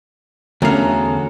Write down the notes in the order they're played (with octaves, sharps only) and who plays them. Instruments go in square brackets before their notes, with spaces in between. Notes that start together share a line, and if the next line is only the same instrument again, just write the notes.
[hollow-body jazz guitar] E2 F5 [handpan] D3 A3 C#4 [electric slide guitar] F#4 A4 [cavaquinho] A#4